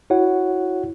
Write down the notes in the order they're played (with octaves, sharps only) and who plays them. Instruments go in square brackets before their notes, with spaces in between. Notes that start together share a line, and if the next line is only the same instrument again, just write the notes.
[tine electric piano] E4 F#4 C#5 F#5